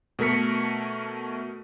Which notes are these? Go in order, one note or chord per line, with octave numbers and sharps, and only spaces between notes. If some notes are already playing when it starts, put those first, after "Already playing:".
B2 A3 A#4 B6 C#7